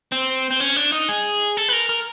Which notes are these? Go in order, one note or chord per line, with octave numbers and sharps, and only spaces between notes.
C4
C4
C#4
D4
D#4
G#4
A4
B4
A#4
A#4